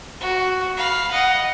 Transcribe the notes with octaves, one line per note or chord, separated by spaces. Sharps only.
F#4
F5 B5
D#5 F#5